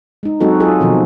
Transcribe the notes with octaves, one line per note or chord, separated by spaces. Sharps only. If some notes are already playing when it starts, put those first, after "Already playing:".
G#3 D#4
F#3 G#3 C4 D#4 F#4 A4
F4 G#4 A4
B2 D#3 F3 C4